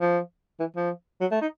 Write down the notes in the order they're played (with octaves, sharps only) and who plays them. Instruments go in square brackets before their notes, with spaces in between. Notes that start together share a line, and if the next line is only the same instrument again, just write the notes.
[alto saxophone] F3
E3
F3
F#3
A3
D#4